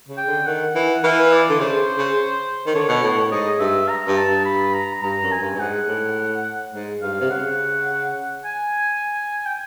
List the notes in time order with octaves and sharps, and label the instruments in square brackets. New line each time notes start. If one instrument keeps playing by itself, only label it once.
[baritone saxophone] C#3
[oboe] G5
[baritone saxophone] D3
[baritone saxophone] D#3 [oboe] F#5
[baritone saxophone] E3
[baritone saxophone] E3 [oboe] F5
[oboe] D5
[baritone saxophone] D3
[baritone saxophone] C#3 [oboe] C5
[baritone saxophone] C#3
D#3
[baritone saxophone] D3 [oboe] C#5
[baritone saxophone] B2
A2
A2
[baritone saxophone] G#2 [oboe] D#5
[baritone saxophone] G2 [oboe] E5
[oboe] A#5
[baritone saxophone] G2
[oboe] A5
[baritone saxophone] G2
[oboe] B5
A#5
[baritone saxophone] G2 [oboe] A#5
[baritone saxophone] F#2
[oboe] G#5
[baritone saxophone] G2
G2
[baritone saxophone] G#2 [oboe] F#5
[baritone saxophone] A2
G#2
[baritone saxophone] G2 [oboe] F5
[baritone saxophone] C3
[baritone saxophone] C#3 [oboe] F#5
[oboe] G#5
G5